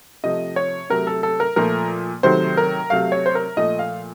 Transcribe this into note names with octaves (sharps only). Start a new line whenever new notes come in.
C3 F3 A3 D#5
C#5
C3 F#3 A3 A#4
A4
A4
A#4
A#2 F3 A3 A#4
C3 D#3 F#3 A3 C5
A#4
C3 F#3 A3 F5
C#5
C5
A#4
A#2 F3 A3 D#5
F5